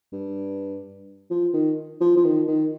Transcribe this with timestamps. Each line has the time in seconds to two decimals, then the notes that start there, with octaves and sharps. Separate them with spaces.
0.12 G2
1.30 F3
1.53 D#3
2.01 F3
2.17 F3
2.24 D#3
2.48 D#3